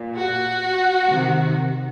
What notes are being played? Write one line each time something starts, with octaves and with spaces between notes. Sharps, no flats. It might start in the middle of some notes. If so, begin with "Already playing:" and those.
Already playing: A#2
F#4
C3 D#3